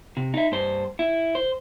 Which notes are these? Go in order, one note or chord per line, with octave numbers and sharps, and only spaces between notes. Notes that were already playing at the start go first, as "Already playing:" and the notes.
C3
D#4 E5
G2 C5
E4
C5